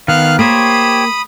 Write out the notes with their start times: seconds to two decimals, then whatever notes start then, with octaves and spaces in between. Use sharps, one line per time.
0.08 D#3 B3 F5 F6 F#6
0.39 A#3 G4 C5 C#5 B5 D#6